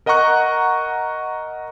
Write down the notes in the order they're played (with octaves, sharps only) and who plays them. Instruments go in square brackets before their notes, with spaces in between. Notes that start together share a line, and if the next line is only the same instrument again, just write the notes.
[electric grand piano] A#4 D#5 F#5 A#5 C#6 F#6